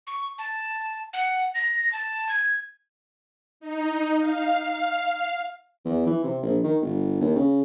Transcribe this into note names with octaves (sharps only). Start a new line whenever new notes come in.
C#6
A5
F#5
A#6
A5
G#6
D#4
F5
E2
E3
C3
A#1
D#3
G1
D#2
C#3